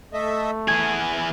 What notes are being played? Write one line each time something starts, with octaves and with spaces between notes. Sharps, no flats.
A3 A4 D#5 E5
E3 B3 G#4 G#6